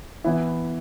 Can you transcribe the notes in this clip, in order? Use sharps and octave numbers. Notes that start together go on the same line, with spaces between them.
E3 B3 E4